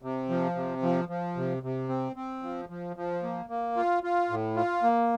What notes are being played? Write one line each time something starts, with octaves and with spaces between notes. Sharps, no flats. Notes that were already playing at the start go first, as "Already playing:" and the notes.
C3
F3
C3
F3
F3
C3
C3
C4
C4
F3
F3
F3
A#3
A#3
F4
F4
A2
F4
A#3